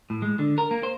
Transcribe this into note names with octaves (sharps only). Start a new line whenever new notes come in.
A2
G#3
D3
A#4
A#3
C5